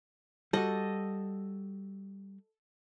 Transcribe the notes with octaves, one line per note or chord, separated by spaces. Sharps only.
G3 F#4 A4 D#5